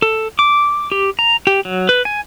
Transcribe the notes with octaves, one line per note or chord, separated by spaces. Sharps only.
A4
D6
G4
A#5
G4
F#3
B4
G#5